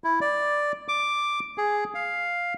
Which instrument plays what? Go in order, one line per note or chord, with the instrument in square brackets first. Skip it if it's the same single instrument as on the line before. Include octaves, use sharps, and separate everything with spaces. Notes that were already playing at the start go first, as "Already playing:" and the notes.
[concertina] E4
D5
D6
G#4
F5